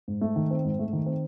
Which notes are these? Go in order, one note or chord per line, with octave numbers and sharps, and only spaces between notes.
G#2
A3
D#3
C4
G#2
A3
D#3
C4